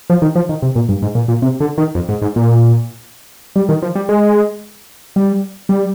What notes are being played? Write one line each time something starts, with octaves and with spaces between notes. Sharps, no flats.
F3
D#3
F3
D#3
C3
A#2
G2
G#2
A#2
A#2
C3
D3
D#3
F2
G#2
G#2
A#2
G3
D#3
F3
G3
G#3
G3
G3